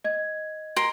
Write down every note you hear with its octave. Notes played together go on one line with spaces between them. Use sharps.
D#5 G#6
A#4 C6